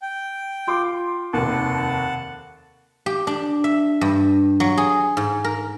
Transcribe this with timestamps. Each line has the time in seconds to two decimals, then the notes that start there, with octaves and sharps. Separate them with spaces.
0.02 G5
0.67 F4 C6 D6
1.33 F1 D#2 F#5 A5
3.06 G4
3.27 D4
3.64 E5
4.01 G2
4.60 F#3
4.77 G#4
5.17 G#2
5.44 A#4